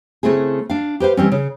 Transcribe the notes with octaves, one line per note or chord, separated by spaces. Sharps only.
C#3 A3 C4 E4 G#4
D4 F5
G4 B4 C5 F5
E3 G3 C4 C#4
C#3